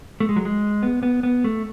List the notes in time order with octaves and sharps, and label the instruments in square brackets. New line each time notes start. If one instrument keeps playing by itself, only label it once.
[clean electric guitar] A3
G#3
F#3
G#3
B3
B3
B3
A3